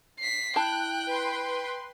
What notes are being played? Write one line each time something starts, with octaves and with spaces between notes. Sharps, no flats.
B6 C7
E4 G5 A5 F#6
B4 C6